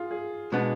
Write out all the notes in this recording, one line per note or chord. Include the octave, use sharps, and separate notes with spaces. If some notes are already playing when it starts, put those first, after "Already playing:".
Already playing: F4 G#4
G#4
B2 G#3 B3 D4